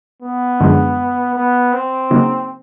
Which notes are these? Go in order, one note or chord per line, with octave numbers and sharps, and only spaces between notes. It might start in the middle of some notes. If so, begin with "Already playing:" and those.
B3
F#2 D3 F3 G#3
B3
C4
C#3 F#3 A#3 D#4